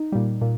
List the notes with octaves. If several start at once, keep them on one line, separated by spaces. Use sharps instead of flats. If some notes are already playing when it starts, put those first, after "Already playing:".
Already playing: D#4
A#2 G3
A#2